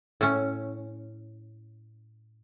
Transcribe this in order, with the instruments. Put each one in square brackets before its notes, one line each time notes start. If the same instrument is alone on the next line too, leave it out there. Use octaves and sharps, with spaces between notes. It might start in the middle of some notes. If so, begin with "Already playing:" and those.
[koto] A2 C#4